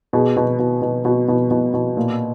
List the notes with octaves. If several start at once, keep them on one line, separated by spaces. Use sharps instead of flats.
B2 G#4
B2
B2
B2
B2 F#4
B2
B2
B2
A#2